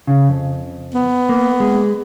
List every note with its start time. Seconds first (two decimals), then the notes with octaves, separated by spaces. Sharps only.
0.07 C#3
0.29 F2
0.95 B3
1.29 A#3
1.60 G#3